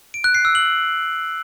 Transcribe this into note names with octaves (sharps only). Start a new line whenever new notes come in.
D7
F#6
C7
E6
F#7